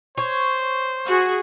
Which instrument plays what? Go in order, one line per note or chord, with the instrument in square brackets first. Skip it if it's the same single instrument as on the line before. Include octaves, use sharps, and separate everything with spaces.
[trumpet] C5 [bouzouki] C#5
[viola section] F#4 G#4